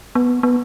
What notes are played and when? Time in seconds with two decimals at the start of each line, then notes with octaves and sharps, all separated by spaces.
0.15 B3
0.43 B3